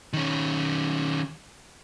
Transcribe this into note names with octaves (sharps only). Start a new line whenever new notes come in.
D#3 C#4